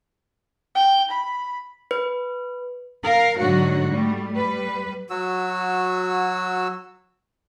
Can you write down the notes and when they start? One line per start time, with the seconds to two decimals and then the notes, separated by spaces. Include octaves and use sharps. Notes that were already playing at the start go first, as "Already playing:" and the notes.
0.75 G5
1.10 B5
1.91 B4
3.04 A#4 F5
3.39 G#2 D3 F#3 F#4
3.91 G3 A3
4.34 G3 B4
5.10 F#3 F#4 E6